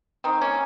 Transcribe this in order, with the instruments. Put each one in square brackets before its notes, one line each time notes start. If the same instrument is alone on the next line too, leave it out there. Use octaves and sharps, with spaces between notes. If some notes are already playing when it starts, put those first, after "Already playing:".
[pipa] D#3 C4
A#3 C#4